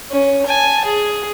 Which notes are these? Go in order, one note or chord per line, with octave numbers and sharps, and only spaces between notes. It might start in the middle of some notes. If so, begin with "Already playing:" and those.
C#4
G#5 A5
G#4